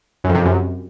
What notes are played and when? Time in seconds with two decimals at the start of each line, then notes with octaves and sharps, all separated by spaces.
0.24 F#2
0.29 F2
0.35 C3
0.40 F2
0.45 F#2